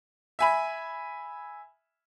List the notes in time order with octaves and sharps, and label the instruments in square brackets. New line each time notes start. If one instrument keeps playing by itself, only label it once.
[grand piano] E5 G#5 B5